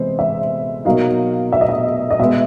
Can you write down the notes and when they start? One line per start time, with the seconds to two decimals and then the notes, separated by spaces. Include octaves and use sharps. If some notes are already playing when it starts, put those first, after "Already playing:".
Already playing: C3 E3 G#3 B3 E4 C5
0.19 E5
0.85 B2 F#3 A#3 D#4 F5
1.53 E5
1.61 D#5
1.69 E5
2.11 D#5
2.19 B2 G#3 B3 E5